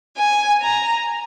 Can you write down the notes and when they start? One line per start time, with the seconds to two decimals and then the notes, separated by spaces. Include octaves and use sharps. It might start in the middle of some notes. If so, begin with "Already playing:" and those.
0.17 G#5
0.62 A#5